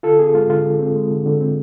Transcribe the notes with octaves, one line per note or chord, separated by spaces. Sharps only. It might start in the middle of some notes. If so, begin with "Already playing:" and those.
D3 F4 A4
C4 G#4
G#3 F4
D3 F4
D3
C4
G#3
D3
D3
C4